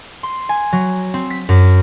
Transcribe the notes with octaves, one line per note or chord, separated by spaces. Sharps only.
C6
G#5
F#3
C4
B6
F#2